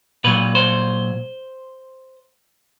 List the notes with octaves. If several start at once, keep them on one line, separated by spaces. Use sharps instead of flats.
A#2 F#3 B4
C5